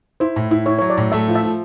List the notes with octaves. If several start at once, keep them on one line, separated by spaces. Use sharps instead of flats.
E4 C5
A2
E4
E4 C#5
F#3 C#5
D5
A2
A3 E5
F3
E5
F3